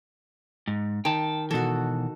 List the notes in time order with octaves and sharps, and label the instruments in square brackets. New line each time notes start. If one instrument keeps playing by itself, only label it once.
[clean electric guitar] G#2
[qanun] D#3 [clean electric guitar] G5 A5
[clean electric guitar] B2 E3 [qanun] F#4 A4